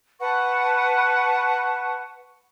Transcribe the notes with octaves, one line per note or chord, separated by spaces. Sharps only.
B4 F#5 A5 C#6